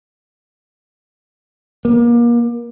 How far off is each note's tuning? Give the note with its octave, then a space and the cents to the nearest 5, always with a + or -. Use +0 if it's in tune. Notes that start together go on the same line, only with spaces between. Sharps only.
A#3 +30